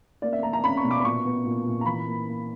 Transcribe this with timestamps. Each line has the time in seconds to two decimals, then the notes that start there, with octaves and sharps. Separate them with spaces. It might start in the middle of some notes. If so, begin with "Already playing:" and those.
0.22 A#3 D5
0.33 E5
0.43 A#3 A#5
0.53 A#5
0.64 C#4 B5
0.77 C#6
0.84 B2
0.91 D6
1.00 B5
1.05 A#2 C#6
1.25 B3
1.45 A#2
1.66 A#2
1.81 A#5
1.86 E3 B5
2.07 A#3
2.26 A#3